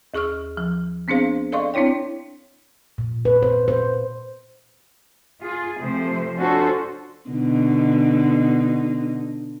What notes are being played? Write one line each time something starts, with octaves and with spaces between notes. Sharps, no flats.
D#2 G#4 C#6 E6 F6
F3
B3 C4 D4 G#4 C5 F5
A4 D5 D#5 F5 C6 C#6
C4 D4 E4 C#5 G5
A#2
B4
C5
C5
F4 G#4
C3 F3 A3 C5
C#4 D4 F4 F#4 A4 C5
B2 D3 D#4